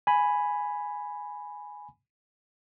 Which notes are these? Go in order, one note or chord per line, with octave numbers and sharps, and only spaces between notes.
G#5 B5